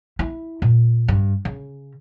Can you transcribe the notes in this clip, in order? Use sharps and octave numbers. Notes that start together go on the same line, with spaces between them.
E4
A#2
G2
C#3